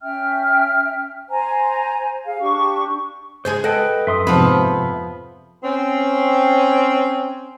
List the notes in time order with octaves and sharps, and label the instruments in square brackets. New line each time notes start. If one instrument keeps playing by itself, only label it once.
[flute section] C#4 E5 G5 F6
C5 G#5 A#5
G#4 F5
D4 G4 C#6
[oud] C#3 G#3 G#4 [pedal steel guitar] C5
[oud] A4 [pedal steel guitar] B4 D#5 G5 [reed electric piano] F#5
[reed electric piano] F#2 B4 [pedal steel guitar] E5 C6 D#6
[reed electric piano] F2 G#2 C3 [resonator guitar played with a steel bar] F3 B3 B4 [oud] C4
[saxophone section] C4 C#4